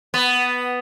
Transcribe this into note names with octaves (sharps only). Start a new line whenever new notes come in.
B3